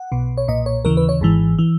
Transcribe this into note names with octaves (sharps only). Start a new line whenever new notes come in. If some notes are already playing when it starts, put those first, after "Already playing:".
Already playing: F#5
B1 B2
C#5
B1 A#2 D#5
C#5
D#2 C#3 E3 A#4
B4
C#5
G#1 G#2 E3
E3